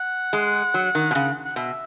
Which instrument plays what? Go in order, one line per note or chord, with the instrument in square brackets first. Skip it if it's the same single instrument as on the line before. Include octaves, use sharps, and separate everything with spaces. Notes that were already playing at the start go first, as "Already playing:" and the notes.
Already playing: [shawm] F#5
[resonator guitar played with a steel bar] G#3
F#3
D#3
B2
C#3
[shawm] F#5
[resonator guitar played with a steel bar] B2 [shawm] E5